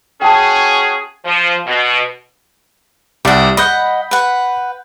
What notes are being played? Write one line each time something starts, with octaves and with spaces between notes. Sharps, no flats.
C#4 F#4 G#4 G5 A5
F3
B2
C2 G3 D5 F#5
D#5 F#5 B5 G6
B4 F#5